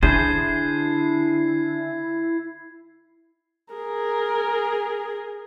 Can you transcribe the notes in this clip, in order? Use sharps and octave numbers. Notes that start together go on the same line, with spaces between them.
D3 D4 E4 G#4 C5 G#6 C7
G#4 A#4